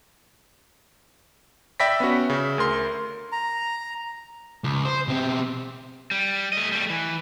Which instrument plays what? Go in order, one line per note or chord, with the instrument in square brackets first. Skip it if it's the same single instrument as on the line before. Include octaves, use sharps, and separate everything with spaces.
[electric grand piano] D5 E5 G5 B5 A#6 B6
B3 C#4 F#4
C#3 E5
D2 A#4 C6
[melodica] A#5
[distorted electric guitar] C#2
C5
B2 C4
[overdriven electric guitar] G3
A3 D#5
G3 A3
E3